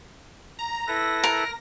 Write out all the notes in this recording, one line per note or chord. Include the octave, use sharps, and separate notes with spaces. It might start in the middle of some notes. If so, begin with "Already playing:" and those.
A#5
E4 A4 B4 A#6
A#4